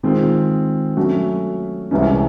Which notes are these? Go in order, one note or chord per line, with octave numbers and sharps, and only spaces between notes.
D#3 G#3 C4 F4
F#3 A3 C#4 F#4
C2 C3 E3 G#3 C#4